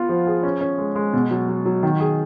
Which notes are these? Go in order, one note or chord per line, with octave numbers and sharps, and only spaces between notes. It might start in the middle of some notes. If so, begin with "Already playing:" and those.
Already playing: B3 F4
F3
G#4
C#4
C#4
G#3
G#3
B2
F#3
F#3
F#3
D#3
G#4